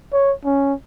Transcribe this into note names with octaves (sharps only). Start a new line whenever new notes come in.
C#5
C#4